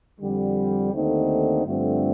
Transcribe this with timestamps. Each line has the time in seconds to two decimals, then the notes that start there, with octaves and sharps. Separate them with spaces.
0.20 F2 D3 G3
0.92 D#2 D3 A3 C4 D#4
1.64 G2 D3 F3 A3 C4